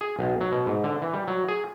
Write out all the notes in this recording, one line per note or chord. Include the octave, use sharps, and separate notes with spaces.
G#4
B1
F#3
B2
G#2
D3
E3
G3
F#3
G#4